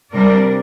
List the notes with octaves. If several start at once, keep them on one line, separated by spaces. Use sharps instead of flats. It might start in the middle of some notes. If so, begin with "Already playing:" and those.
C3 G3 D4 A#4 D5